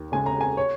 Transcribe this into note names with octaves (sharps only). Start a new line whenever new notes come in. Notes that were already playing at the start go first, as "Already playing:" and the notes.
Already playing: D#2
C#3 G#3 G#5
A#5
G#5
C#5